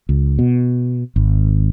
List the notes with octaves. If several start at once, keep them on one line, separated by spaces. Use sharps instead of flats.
C#2
B2
G#1